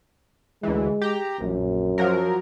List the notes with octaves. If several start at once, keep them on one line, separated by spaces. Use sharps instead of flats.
D2 E3 G#3
G4 A#5
A#1 F#2
F3 F#3 A#4